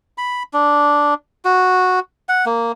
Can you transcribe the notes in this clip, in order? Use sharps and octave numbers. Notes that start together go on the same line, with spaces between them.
B5
D4
F#4
F#5
A#3